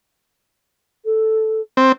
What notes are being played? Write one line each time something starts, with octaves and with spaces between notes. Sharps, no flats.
A4
C4